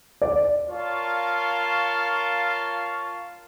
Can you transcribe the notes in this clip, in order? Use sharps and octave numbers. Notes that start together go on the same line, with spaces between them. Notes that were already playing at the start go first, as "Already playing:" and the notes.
D5
F4 A#4 C#5 F5 A5 C#6